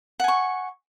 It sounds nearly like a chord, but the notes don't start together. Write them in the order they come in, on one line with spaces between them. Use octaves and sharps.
F#5 G#5 C#6